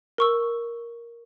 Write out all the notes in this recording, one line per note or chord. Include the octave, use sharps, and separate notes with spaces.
A#4 C#6 E6